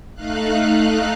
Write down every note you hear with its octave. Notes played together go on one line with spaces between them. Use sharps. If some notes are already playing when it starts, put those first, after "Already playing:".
A3 D#4 F5 F#6